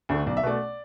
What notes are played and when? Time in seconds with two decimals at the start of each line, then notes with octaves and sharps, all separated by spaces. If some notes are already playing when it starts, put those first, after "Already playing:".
0.09 D2 D3 A3
0.26 B1 D5
0.37 E5
0.43 B2 A3 D5